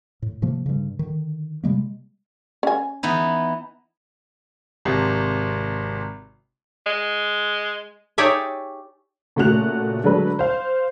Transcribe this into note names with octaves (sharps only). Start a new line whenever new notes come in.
A2
A2 C3 F3 A#3
G2 C#3
D3 D#3
C3 G3 G#3 A#3
C#4 G#5
E3 B3 D#4
G#1 C3
G#3
D#4 G4 G#4 C#5 D5 E5
A#2 C#3 A3 F#4 F#6 F7
D3 F#3 G#3 D4 A4 B4
C5 F5